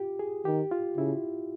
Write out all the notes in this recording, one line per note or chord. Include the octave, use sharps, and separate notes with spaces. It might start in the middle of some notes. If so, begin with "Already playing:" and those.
Already playing: F4 G4
G#4
D#3 G4
F4
C#3 E4